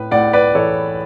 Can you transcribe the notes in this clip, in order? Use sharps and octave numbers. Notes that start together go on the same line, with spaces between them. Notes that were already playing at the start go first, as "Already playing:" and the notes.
Already playing: A2 B4
A2 D5 F#5
B4 D5
E3 A4 C#5